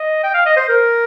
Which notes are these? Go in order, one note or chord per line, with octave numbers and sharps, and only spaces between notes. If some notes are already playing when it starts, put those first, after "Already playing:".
Already playing: D#5
G5
F5
D#5
C5
A#4